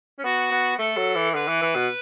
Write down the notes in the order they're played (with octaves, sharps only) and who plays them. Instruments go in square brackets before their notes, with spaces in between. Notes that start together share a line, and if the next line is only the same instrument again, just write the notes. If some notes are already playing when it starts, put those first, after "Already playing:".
[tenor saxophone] C#4
[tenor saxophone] B3 [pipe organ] F#4
[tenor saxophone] B3
[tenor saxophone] A3 [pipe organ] A4
[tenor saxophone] F#3
E3
[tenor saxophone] D3 [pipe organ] B4
[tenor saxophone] E3
E3
B2